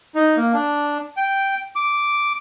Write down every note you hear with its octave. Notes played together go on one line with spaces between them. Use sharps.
D#4
A#3
D4
G5
D6